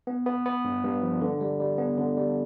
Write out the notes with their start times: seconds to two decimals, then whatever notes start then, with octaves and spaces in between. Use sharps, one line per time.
0.07 B3
0.26 B3
0.46 B3
0.64 G2
0.84 G2
1.02 F3
1.21 D3
1.41 G3
1.60 G3
1.78 B3
1.98 D3
2.17 G3